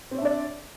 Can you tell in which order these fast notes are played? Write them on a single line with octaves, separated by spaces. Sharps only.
C4 C#5 E5 D4 D5